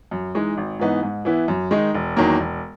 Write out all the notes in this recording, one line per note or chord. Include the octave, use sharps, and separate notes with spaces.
F#2
E3 G#3 D#4
G#1
G#2 E3 B3 D#4
G#2
E3 B3 E4
F#2
D#3 G#3 D#4
E1
E2 D#3 F#3 A#3
E1